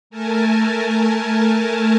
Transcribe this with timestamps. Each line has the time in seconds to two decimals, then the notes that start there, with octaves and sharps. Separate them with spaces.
0.10 A3 A#4 G#5 A5